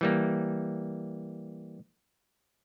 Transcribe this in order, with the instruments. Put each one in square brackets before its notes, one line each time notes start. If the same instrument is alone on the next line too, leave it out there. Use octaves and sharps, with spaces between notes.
[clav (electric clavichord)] E3 G3 A#3